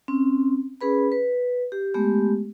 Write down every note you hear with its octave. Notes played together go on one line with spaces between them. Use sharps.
C4 C#4
C#4 G#4 B4 B5
B4
G4
G#3 A3 B3 G4